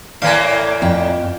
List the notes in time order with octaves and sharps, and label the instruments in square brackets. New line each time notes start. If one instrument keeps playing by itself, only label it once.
[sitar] A2 E3 A#3 [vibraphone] D5 [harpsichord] F5 G#5
[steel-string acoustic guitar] F2 G5